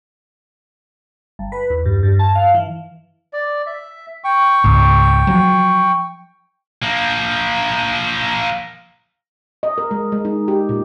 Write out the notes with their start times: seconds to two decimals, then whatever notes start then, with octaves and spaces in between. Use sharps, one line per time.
1.39 G1
1.52 B4
1.70 E2
1.85 G2
2.03 G2
2.19 A5
2.35 F5
2.54 E3
3.33 D5
3.66 E5
4.24 G5 C#6
4.64 C#2 G#2
5.27 F3 F#3
6.82 F3 A#3
9.63 D#5
9.78 A#4
9.91 G#3
10.12 G#3
10.25 D#4
10.48 G4
10.69 A#2